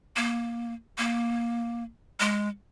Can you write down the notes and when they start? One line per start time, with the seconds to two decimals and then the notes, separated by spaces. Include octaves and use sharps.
0.16 A#3
0.98 A#3
2.20 G#3